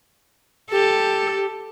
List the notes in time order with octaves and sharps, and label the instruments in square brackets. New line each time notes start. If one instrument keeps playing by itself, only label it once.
[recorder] G4 [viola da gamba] A4